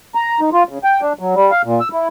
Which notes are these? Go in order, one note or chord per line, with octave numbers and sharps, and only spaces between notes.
A#5
D#4
F4
C#3
G5
D4
F#3
G3
F5
A#2
E6
E4